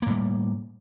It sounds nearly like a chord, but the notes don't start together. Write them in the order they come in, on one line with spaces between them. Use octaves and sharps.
A#3 A2 G3